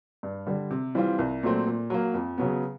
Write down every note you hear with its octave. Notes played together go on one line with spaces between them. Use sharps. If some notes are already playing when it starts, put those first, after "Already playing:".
G2
D3 G3
C3
E3 G3 C4 F4
C2
A#2 F#3 A3 C4
A#2
F#3 A#3
F2
C#3 F#3 B3